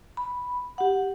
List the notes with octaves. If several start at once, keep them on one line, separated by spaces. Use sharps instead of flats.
B5
G4 F#5